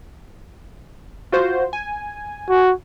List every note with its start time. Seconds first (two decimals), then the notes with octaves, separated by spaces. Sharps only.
1.32 F4 F#4 C5
1.73 G#5
2.50 F#4